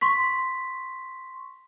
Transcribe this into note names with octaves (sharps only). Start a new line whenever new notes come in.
C6 C#6 B6